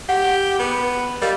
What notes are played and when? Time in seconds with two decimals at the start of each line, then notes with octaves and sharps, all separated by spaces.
0.09 G4 F#5
0.59 B3 G#4
1.22 G3 A#4 D#5 F5